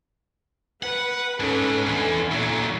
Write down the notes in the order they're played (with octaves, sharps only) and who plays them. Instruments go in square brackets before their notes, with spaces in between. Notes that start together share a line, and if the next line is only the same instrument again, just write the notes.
[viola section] B4 [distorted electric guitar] F#5
[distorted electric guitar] G#2 [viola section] C#4 A4 B4
[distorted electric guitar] E2 E3 [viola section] D3 E4
[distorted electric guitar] A#2 F#3